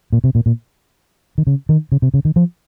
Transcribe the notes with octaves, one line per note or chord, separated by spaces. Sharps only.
A#2
C3
A#2
A#2
D#3
C#3
D#3
C#3
C3
C#3
D#3
F3